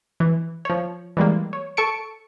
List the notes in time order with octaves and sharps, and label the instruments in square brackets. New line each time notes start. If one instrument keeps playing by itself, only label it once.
[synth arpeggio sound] E3
F3 C#5
E3 G3 G#3 A#3
C#5
A4 A5 C#6 C#7 D7